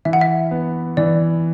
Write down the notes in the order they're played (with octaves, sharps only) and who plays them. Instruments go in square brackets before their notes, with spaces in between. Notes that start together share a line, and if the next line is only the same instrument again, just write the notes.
[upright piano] E3 [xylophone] E5
[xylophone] F#5
E5
[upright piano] B3
[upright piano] E3 [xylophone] D5